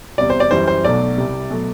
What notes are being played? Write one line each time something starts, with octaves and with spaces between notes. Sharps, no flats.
E2 C3 G3 D5
C5
D5
F#2 E3 G3 C5
C5
B1 B2 F#3 A3 D5
C2 C3 G3
B2 F#3 A3